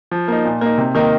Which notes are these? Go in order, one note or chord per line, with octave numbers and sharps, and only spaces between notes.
F3
A#3 D#4
A#2
A#3 D#4
C3
D#3 A#3 D#4